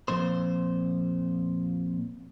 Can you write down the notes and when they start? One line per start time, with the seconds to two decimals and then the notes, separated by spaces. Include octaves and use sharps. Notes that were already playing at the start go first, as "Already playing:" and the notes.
0.08 F2 A#2 C5